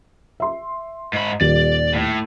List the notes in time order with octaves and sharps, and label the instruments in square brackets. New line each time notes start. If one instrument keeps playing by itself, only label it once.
[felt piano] E5 C6
[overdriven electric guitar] G#2 B5
[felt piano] D#1 G4 [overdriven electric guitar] D5
[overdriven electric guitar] A2